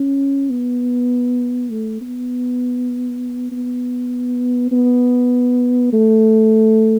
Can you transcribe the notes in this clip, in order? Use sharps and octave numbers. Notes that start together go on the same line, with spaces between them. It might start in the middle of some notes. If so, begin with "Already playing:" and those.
Already playing: C#4
B3
A3
B3
B3
B3
A3